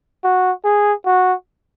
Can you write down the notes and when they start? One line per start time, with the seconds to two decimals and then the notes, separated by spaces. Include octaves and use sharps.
0.24 F#4
0.65 G#4
1.06 F#4